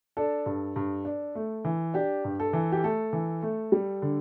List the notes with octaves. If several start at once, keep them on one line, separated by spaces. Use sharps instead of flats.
D4 A4
G2
G2
D4
A3
E3
D4 G4
G2
A4
E3
G4
A3 A4
E3
A3
G3
D3